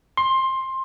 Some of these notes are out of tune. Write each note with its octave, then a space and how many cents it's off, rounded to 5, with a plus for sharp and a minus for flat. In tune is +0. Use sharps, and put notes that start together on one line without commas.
C6 +20